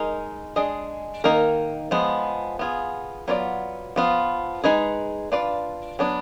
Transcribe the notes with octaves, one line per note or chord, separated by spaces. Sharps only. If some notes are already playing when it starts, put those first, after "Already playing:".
Already playing: G#3 D#4 A#4
G#3 D4 G#4 D#5
D#3 A#3 D#4 A#4
F3 G#3 B3
B3 F4 G#4
F#3 B3 F4 G#4 D5
F3 B3 F4
G#3 D#4 G#4 B4
D4 F4 B4 D5
F#3 B3 D4